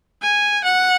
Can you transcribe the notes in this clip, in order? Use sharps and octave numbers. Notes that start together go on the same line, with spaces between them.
G#5
F#5